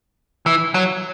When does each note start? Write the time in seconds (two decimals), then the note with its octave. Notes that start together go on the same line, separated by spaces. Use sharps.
0.46 E3
0.74 F#3